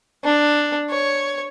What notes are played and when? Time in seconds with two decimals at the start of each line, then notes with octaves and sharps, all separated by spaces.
0.24 D4
0.90 C#5